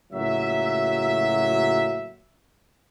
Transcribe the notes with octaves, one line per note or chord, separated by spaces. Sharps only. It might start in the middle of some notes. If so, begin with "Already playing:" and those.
C#2 A2 F#3 A#3 F#4 E5